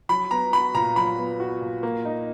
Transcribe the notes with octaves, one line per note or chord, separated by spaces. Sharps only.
F#3 B5
B3 A#5
F#4 B5
A#2 A#5
F#3 B5
B3
F#4
A#2
A#3
D#4